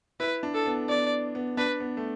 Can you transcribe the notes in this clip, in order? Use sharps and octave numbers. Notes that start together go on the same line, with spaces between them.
E4 B4
D4
A4
B3
B3 D5
B3
D4 B4
B3
A3